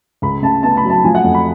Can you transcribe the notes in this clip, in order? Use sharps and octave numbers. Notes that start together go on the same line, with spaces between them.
C#2 B5
C#3 A5
B3 A5
B5
F#3
A5
F3 G#5
F#5
F2
B5